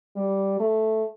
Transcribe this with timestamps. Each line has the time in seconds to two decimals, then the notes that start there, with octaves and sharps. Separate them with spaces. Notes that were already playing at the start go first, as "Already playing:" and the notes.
0.16 G3
0.60 A3